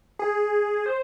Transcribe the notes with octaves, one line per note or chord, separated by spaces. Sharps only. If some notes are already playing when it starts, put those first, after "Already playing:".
G#4
C5